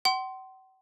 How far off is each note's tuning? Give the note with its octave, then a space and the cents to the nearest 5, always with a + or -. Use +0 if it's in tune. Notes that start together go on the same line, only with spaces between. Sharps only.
F#5 +45 C6 +0